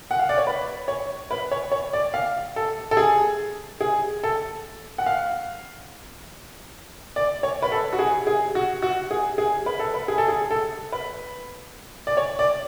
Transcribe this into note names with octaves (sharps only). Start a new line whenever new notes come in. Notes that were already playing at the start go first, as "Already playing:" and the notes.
F#5
F5
D5
C#5
B4
C#5
B4
C#5
C#5
D5
F5
A4
A4
G#4
G#4
A4
F#5
F5
D5
C#5
B4
A4
F#4
G#4
G#4
F#4
F#4
G#4
G#4
B4
A4
B4
G#4
A4
G#4
A4
B4
D5
C#5
D5